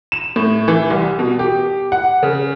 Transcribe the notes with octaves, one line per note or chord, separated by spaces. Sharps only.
E7
A2
E3
C2
B2
G4
F#5
C#3